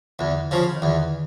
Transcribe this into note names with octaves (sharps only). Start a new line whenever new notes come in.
E2 D3
C#3 F3
D#3
E2 D3